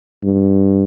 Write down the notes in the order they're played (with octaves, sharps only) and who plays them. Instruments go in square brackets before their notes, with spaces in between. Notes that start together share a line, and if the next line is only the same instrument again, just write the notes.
[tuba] G2